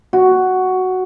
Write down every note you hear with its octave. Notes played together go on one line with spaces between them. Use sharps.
F#4